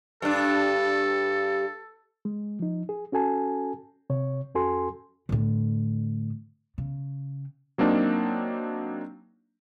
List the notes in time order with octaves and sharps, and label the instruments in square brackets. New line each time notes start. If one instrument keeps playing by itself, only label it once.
[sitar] G2 D4 [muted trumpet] A4
[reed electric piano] G#3
F3 D#4
G#4
C#4 F#4 A4 G#5 A5
C3 C#5
F2 C#4 F#4 A4 G#5 C6
[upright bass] A2 D3
C#3
[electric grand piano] F#3 A#3 C4 D4 D#4